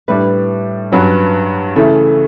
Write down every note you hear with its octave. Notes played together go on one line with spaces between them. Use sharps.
A2 G3 D4 B4
G2 F#3 C#4 B4
C#3 E3 A3 A4